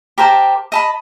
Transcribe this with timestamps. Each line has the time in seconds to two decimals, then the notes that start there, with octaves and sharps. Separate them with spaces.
0.18 G4 A#4 C5 A5
0.72 D#5 A5 B5